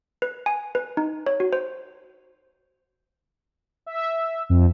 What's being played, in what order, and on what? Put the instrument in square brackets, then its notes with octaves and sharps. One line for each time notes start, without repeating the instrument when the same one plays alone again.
[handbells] B4
G#5
B4
D#4
C#5
F#4
C5
[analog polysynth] E5
F2